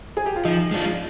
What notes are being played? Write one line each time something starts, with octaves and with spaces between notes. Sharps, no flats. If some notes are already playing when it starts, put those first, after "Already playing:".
G#4
G4
F4
F3 D#4
G#3 D4 F4